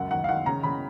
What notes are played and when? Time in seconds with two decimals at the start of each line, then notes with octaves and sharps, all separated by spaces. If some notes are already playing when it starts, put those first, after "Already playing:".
Already playing: C#2 F#2 F#5
0.11 D#3 F#5
0.24 F5
0.28 D#3 F#5
0.46 C#3 A#5
0.63 C#3 B5